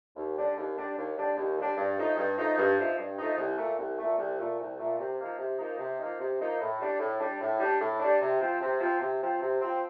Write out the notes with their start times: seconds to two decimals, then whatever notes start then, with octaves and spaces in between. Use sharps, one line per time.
0.16 D#2
0.36 D3 G3 D4
0.56 D#2
0.76 D3 G3 D4
0.97 D#2
1.17 D3 G3 D4
1.36 D#2
1.57 D3 G3 D4
1.77 G2
1.97 F3 A3 D#4
2.17 G2
2.36 F3 A3 D#4
2.57 G2
2.77 F3 A3 D#4
2.97 G2
3.18 F3 A3 D#4
3.37 C2
3.57 A#2 A3
3.78 C2
3.98 A#2 A3
4.17 C2
4.38 A#2 A3
4.59 C2
4.78 A#2 A3
4.98 C3
5.19 F3 A#3 D#4
5.38 C3
5.58 F3 A#3 D#4
5.78 C3
5.98 F3 A#3 D#4
6.19 C3
6.40 F3 A#3 D#4
6.59 A2
6.79 G3 D4
6.99 A2
7.19 G3 D4
7.40 A2
7.59 G3 D4
7.80 A2
8.00 G3 D4
8.21 C3
8.40 F3 C4
8.61 C3
8.80 F3 C4
9.00 C3
9.21 F3 C4
9.41 C3
9.60 F3 C4